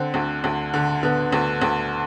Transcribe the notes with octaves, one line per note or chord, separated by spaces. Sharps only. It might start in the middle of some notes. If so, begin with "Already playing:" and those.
Already playing: D3 C4
D2
D2
D3
D3 B3
D2
D2